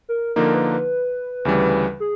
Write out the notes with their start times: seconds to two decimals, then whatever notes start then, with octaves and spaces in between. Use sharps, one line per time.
0.09 A#4
0.36 D3 F3 A#3 D#4 A#4
0.54 B4
0.72 B4
1.45 D2 C#3 E3 G3
2.00 G#4